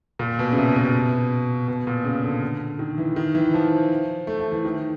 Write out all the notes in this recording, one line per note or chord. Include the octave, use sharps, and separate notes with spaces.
A#2
B2
C#3
C3
B2
B2
A#2
C#3
D3
D#3
E3
D#3
E3
F3
A3
A3
E3
D#3